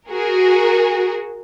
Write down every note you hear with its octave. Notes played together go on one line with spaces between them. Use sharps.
F#4 G#4 A#4